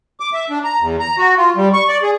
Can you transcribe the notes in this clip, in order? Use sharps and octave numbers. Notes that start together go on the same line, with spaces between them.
D6
E5
D4
A#5
E2
A#5
F#4
F4
G3
C#6
D5
G#4